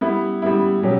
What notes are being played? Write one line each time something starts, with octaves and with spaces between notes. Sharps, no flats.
G3 B3 E4
G3 B3 E4
B2 F#3 C#4 G4